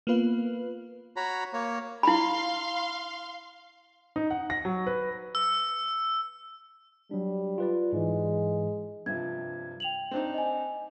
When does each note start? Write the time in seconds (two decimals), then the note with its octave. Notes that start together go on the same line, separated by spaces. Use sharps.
0.07 A#3 B3 F4 B4 F5
1.16 F#4 C#5 A#5 B5
1.53 A#3 C#5
2.03 E4 F5 B5 C6
4.16 D#4
4.30 F#5
4.50 A#6
4.65 F#3
4.87 B4
5.35 E6
7.11 F#3 G3 D4
7.58 F4 B4 D5
7.93 G#2 E3 G#3
9.06 G2 C3 F3 G#6
9.80 G5 F7 F#7
10.11 C4 D4 D#4
10.34 D#5 G#5